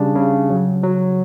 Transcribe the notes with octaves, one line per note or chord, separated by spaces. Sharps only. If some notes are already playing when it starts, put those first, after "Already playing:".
Already playing: C#3 G3 D4
C#3
F#3
F#3